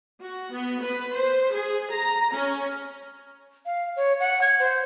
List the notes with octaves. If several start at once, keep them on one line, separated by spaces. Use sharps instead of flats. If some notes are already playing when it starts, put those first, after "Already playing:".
F#4
B3
B4
C5
G#4
A#5
C#4
F5
C#5
F#5
G#6
C5